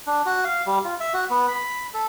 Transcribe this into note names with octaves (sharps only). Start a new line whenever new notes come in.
D4
F#4
F5
G3
F4
E5
F#4
B3
B5
A4